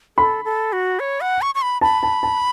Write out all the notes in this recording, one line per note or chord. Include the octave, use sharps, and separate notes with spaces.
A4 B5
A4
F#4
C#5
F#5
C#6
C#6
B5
A5 B5
A5
A5